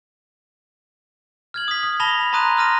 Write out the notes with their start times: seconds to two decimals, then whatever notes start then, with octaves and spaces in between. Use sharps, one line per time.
1.54 F6 G#6 F#7
1.68 D#6 B6
1.83 D#6
2.00 A5 B5 A#6 F7 G7
2.33 A5 A#5 C6 D#6 F#6 D#7
2.57 D#6 F6 A#6 D#7